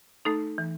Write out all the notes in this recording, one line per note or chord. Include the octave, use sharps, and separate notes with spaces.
A3 D#4 A4
E3